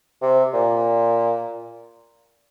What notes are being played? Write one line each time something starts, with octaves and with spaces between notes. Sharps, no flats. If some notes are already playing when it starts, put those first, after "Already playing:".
C3
A#2